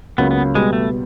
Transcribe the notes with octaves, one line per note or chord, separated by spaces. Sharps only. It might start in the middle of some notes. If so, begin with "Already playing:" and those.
C#2 C#3 F#3 A#3 B3 C#4
B3
B2 G3 G#3 B3
A3